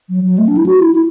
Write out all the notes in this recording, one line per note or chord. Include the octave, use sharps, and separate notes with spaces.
F#3
F#3
A3
D4
E4
F#4
E4
E4